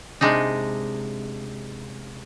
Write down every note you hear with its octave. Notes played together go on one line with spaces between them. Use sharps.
C3 G#3 D4 D#4